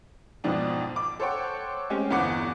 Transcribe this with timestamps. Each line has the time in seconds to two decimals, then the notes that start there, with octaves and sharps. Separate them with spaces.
0.44 F2 G#2 B2 F3 D4
0.96 D6
1.19 A4 C5 C#5 F#5 G5
1.90 G#3 A3 C4 C#4 G4
2.10 G1 E2 E3 B3 F#5 D6